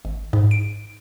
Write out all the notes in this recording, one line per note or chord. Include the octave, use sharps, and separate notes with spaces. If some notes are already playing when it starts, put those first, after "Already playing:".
G#1
G#2
D7